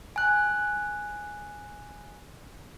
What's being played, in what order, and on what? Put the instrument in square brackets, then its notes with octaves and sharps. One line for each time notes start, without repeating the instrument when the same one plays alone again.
[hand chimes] G#5 F#6